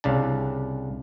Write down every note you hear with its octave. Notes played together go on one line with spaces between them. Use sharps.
C2 C#3 D4 A5